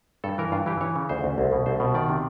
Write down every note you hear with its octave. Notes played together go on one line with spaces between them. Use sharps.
G2 A4
E3 A#4
G2 F4
E3 G4
E3 C#5
C#3
D2 C5
D2
C2
B2
C2 C5
B2
D#3 D5
C3